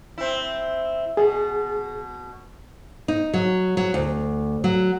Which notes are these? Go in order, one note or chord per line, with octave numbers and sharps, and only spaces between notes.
C4 E4
B2 G#4
D#4
F#3
F#3
D2
F#3